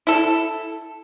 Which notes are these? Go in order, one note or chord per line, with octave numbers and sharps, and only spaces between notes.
E4 A4